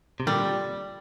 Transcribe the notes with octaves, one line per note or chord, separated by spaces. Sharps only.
C3
A#2 D3 G3